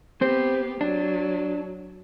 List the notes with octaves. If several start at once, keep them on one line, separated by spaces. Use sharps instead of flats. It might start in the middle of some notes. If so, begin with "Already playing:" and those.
B3 C4 G4 C5
F#3 D4